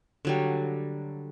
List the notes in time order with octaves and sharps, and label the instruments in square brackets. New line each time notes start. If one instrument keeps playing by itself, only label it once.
[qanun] D3 F#3 G3